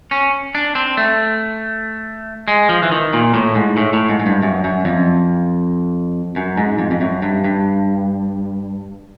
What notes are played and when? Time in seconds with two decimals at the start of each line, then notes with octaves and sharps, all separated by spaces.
0.11 C#4
0.55 D4
0.75 C4
0.97 A3
2.48 G#3
2.69 F3
2.83 E3
2.91 D#3
3.13 A#2
3.34 A2
3.55 G#2
3.77 A2
3.93 A2
4.09 G#2
4.19 G#2
4.26 G2
4.43 F#2
4.64 F#2
4.85 F2
6.36 F#2
6.58 G#2
6.79 F2
6.91 F2
7.01 F#2
7.22 G2
7.44 G2